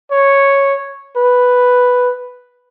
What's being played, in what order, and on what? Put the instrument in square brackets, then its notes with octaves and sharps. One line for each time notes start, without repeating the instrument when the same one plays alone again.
[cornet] C#5
B4